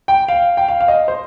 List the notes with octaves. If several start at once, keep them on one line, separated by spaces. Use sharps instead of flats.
G5
F5
G5
F5
F5
D#5
C5